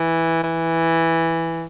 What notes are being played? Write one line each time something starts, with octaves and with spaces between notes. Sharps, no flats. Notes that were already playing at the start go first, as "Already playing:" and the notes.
Already playing: E3
E3